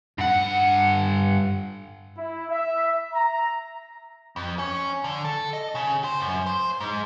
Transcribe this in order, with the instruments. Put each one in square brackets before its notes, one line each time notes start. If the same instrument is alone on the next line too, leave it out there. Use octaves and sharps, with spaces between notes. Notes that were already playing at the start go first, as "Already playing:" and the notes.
[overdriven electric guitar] G2 F#5
[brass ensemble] E4
E5
A#5
[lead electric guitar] F2
C#4
D3
A4
D#5
C#3
C5
F#2
C5
G#2